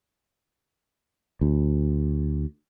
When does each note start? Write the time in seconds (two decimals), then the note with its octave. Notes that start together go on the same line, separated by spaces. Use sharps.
1.41 D2